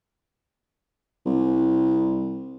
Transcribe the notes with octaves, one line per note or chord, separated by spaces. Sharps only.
C2